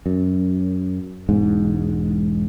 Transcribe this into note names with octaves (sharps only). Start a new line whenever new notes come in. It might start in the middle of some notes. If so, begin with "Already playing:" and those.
F#2
E1 G#2